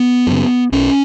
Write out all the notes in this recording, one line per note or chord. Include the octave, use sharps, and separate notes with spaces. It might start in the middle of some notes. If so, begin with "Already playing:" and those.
Already playing: B3
F#2 C#3
B1 C#4